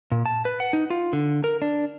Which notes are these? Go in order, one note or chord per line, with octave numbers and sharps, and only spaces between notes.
A#2
A5
B4
F#5
D#4
F4
D3
A#4
D4